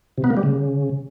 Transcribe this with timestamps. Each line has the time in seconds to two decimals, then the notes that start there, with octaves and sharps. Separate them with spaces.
0.18 C3
0.24 B3
0.30 A#3
0.37 G3
0.43 C#3